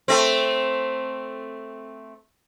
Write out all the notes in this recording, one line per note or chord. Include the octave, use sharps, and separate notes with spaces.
A3 C4